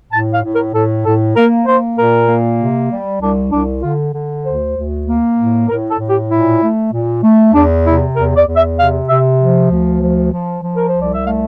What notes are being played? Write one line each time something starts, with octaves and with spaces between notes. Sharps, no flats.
A2 A5
F5
A2
A#4
A2 A4
A2 A4
A#3 A#4
A#3 C5
A#2 A#4
A#3
C3
G3
C2 D4
C2 D4
D3 F4
D3
D2 C5
D2
A#3
A2
A2 A#4
A4
A2
G4
A#2 E4
A3
A#2
A3
E2 D4
C3 E4
E2 A#4
D5
E2
E5
C3 F5
C3 E5
F3
D2
F3
F3
F3
A#4
C5
C2
D5
E5
A3 F5